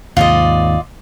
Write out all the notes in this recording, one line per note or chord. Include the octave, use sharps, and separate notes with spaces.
D#2 G#2 C3 F4 D5 D#5